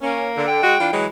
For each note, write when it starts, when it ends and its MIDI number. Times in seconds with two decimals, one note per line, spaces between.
0.01 0.44 58
0.01 0.28 61
0.36 0.60 50
0.47 0.95 79
0.62 0.75 56
0.62 0.75 66
0.79 0.90 52
0.79 0.90 62
0.79 0.90 65
0.92 1.05 52
0.92 1.05 54
0.92 1.05 56